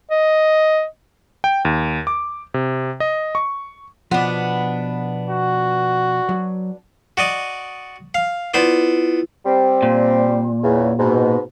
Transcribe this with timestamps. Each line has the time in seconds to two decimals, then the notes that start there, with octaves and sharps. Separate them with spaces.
0.11 D#5
1.44 G5
1.65 D#2
2.07 D6
2.54 C3
3.00 D#5
3.35 C#6
4.11 B2 F3 B3 D4
5.29 F#4
6.29 F#3
7.17 F#4 D5 D#5
8.15 F5
8.54 B3 E4 F4 C5 D5
9.45 G3 C4
9.82 A#2
10.63 E2 C#3
10.98 G#2 B2